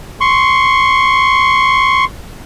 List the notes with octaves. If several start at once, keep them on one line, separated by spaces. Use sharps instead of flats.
C6 C#6